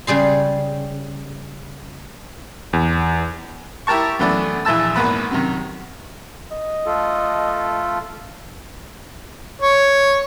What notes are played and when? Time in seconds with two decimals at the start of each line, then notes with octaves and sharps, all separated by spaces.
0.07 C#3 G3 G#4 C6
2.73 E2
3.87 E4 G4 A#4 A5 C#6
4.19 F#2 E3 A3 B3 D4
4.65 A#1 E3 E4 A5 E6
4.96 G#1 A#3 B3 B4
5.31 F#2 C3 D#3
6.52 D#5
6.86 A3 F4 A4
9.62 C#5